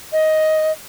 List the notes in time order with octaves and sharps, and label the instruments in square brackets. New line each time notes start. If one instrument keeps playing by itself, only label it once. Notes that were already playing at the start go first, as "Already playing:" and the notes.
[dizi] D#5